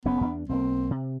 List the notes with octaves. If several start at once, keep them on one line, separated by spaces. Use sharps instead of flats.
F#1 F2 B3 C#4
E2 C#4 D4
B1 A#3 C4
C3